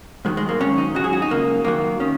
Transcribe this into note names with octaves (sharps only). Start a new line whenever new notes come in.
G#2 D#3 F#3 G#3
G#3
A#3
G#2 D#3 F#3 C#4
D#4
C#2 C#3 F#3 F#4
G#4
F#4
D#4
C#2 C#3 F#3 A#3
F#2 D#3 F#3 A#3
D#3 C#4